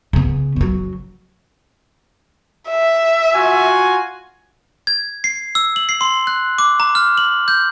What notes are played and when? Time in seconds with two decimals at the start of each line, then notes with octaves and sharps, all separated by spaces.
0.13 C#3 B3
0.56 F#1 F#3
2.69 E5
3.35 F4 F#4 G#5
4.87 G#6
5.24 C7
5.55 E6
5.76 F#7
5.89 C7
6.01 C6
6.27 F#6
6.58 D6
6.80 A#5
6.95 F6
7.18 F#7
7.48 G6